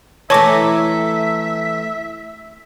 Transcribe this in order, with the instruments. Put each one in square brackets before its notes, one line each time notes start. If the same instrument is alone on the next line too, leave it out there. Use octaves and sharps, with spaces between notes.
[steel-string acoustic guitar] E3 A3 [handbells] C#5 C#6 D6 [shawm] E5 [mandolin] A5 A#5